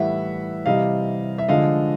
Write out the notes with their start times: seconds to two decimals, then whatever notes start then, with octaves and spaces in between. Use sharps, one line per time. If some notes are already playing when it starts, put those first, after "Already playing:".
Already playing: A2 E3 G3 E5 F#5
0.66 C3 E3 G3 D#5 F5
1.38 E5
1.48 D3 F3 G#3 D#5 F5